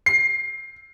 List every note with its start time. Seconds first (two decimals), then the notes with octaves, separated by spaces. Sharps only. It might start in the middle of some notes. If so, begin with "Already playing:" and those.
0.06 C7